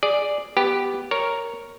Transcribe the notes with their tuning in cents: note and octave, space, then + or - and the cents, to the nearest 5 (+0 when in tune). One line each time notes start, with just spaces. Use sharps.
G#4 +0 D5 +0
B3 +0 G4 +0 B4 +0
A#4 +0 C#5 +0